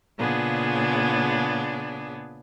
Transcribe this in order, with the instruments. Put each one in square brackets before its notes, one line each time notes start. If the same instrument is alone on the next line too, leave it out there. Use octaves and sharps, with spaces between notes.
[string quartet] A#2 C#3 B3 D4 G#4